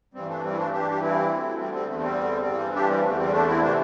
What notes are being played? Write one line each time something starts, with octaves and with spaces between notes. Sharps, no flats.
G2 E3 G3 C4
A3 D4
G3 C4
E4
A3 D4
G2 E3 D4 G4
G4
C4 E4
D2 D3
G3 C4
G3 C4
E2 D3 A3
A3
G3 C4
G2 E3
D4 G4
G3 C4
E2 D3 A3
G3 C4
A3 D4
C4 E4
C3 E3 A3 D4